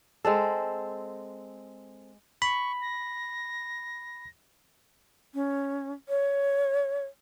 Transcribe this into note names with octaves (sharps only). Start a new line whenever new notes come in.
G#3 C4 A4
B5 C#6
A#6
C#4
C#5